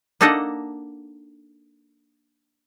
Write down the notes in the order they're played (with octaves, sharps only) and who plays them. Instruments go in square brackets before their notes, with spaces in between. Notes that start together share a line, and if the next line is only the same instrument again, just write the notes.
[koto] A#3 D4 D#4 A4 D#5 F#5